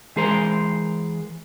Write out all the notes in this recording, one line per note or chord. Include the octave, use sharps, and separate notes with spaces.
E3 G#3 G#4 A#4 C5